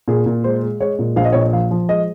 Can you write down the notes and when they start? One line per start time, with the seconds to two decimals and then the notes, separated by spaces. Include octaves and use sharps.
0.08 A#2 G#4
0.26 A#2
0.44 G#3 C5
0.62 G#3
0.80 G#3 C#5
0.99 A#2
1.16 A#1 F5
1.25 D#5
1.33 A#2 C#5
1.41 D#5
1.53 F3 F5
1.71 F3
1.89 G#3 D#5